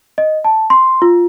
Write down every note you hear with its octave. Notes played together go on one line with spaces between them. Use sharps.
D#5
A5
C6
F4